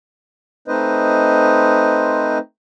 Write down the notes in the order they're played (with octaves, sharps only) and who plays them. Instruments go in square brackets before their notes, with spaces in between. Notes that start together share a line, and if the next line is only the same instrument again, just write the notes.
[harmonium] A3 C4 D#4 B4 C5 D#5